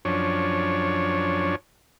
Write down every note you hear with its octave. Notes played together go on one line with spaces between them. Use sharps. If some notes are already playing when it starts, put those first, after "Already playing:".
F#2 F3 C#4 D4 C#5